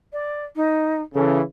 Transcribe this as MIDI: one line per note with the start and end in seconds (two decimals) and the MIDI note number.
0.13 0.45 74
0.56 1.01 63
1.14 1.41 49
1.14 1.41 52
1.14 1.38 69